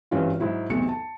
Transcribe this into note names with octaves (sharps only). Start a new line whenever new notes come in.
G#1 G2 E3 C#4 F4
G#2 F#3 E4 F#4
B1 E2 C3 A3 F#4 C#7
A5